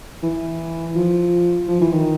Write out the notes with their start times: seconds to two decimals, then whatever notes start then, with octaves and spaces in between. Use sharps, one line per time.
0.23 E3
0.96 F3
1.68 F3
1.81 E3
1.92 D#3